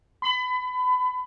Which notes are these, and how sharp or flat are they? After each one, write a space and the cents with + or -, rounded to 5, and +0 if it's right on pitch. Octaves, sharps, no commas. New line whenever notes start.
B5 +30